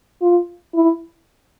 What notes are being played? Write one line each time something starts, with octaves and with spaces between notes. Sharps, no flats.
F4
E4